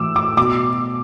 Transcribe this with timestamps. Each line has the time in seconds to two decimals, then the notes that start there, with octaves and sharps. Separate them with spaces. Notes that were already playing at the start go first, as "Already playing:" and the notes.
Already playing: A2 E3 D6 E6
0.16 D6
0.37 B2 D6